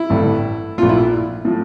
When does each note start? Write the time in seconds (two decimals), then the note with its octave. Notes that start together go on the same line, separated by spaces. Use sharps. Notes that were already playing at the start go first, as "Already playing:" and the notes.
Already playing: E4
0.10 A1 G2 D3 A3
0.78 A#1 A#2 A3 F4
0.89 E4
1.45 A2 F3 A3